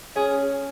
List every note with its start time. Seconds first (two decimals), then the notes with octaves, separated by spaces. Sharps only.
0.16 C#4 G#4